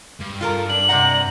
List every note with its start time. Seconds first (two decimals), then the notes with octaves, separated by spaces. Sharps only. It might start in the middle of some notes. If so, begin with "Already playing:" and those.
0.20 G2
0.41 F4 A4 A#4
0.69 D4 F#7
0.89 C3 D5 F#5 A#5